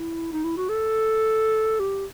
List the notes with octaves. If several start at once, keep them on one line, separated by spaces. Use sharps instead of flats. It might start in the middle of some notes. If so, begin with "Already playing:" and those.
Already playing: E4
D#4
E4
F#4
A4
G4